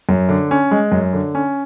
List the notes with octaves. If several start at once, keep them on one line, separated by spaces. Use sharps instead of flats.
F#2
D3
C#4
G#3
F#2
D3
C#4